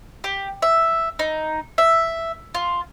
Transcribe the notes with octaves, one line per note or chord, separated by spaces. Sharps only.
G4
E5
D#4
E5
F4